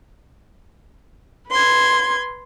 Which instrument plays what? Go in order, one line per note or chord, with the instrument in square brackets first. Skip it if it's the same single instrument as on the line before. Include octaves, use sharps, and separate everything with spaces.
[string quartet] B4 C6 G#6